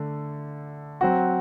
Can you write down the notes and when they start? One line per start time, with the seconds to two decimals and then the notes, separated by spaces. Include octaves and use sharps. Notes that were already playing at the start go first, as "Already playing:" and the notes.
Already playing: D3 A3
1.01 F#3 C4 F#4